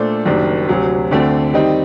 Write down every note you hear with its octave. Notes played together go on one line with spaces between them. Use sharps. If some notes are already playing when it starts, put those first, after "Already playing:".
Already playing: A#2 A3 D4 A4 C5
F#1 F#2 D#3 G3 D4
D2 C3 F#3
D2 D3 A3 C4
D#3 G3 C4 D#4